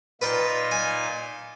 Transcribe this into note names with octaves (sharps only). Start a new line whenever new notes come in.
A#2 D#4 F4 B4 D5 G5
G#5